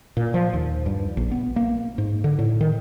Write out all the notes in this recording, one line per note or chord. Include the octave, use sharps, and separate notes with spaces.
A#2
F3
D#2
G2
A#1
B3
A#3
G#2
D3
A2
D#3